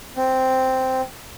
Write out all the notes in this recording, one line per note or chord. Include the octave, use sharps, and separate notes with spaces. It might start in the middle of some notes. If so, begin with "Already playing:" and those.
C4